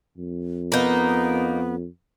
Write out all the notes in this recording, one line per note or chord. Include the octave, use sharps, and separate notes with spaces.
F2
A#3 B3 D#4